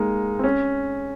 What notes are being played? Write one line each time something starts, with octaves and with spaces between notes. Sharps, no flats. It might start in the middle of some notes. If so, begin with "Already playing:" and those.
Already playing: G#3 A#3 D#4
C4
C#4